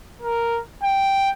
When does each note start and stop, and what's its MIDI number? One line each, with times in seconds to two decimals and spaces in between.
0.22 0.59 70
0.83 1.29 79